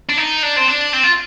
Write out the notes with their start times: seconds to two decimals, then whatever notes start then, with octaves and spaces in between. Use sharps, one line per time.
0.09 D4
0.18 D#4
0.43 D4
0.57 C4
0.68 D4
0.93 C4
1.04 F4